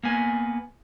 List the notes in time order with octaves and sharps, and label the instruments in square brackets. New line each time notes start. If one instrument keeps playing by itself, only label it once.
[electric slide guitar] A#3 B3 G#5